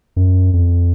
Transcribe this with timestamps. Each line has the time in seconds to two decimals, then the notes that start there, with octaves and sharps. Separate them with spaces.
0.16 F#2
0.53 F2